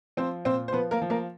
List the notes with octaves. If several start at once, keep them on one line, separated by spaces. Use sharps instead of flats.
F3 C4 C5
A#2 C4 C5
C5
F3 B3 B4
A#3 A#4
F3
A#3 A#4